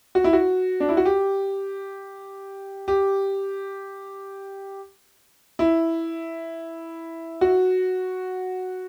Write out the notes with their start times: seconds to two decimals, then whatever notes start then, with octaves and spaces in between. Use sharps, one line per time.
0.15 F#4
0.24 E4
0.33 F#4
0.80 D4
0.89 E4
0.97 F#4
1.05 G4
2.88 G4
5.59 E4
7.41 F#4